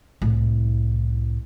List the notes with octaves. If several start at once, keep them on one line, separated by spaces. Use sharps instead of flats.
C2 A2